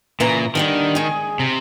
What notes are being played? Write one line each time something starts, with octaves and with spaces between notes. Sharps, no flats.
A#2 C#3 E3 A#5
D3 D#3 G3 D4
G#3 G#4
C3